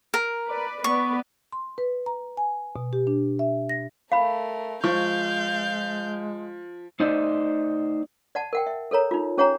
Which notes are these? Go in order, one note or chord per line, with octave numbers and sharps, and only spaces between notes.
A#4
B4 D5
B3 B4 D5 C#6
C6
B4
A#5
G#5
B2
G4
D4
E5
A#6
A3 A#4 F5 B5
F3 G#3 F5 C#6 G6
A3 D#4 C5 D5 E5
D5 F#5 A5
A#4 F#5 G5
E5
A4 A#4 C#5 A#5
D#4 F4
C#4 G#4 C#5 F#5 G#5 A#5